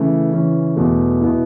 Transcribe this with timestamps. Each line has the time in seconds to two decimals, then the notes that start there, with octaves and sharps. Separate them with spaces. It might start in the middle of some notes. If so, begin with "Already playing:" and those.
Already playing: C#3 E3 A3
0.32 C#3 E3 C#4
0.76 E2 B2 A3
1.21 B2 B3 E4